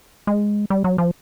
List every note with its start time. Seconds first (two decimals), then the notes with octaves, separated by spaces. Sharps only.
0.27 G#3
0.70 G3
0.84 F#3
0.98 F3